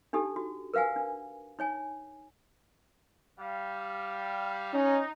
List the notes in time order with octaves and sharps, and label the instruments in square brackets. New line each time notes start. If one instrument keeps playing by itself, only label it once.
[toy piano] D4 D#4 G4 A4
F#4
A#4 B4 F5 F#5 G#5
D4
D#4 C#5 G#5
[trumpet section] G3 F5
[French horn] C#4 [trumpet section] D#4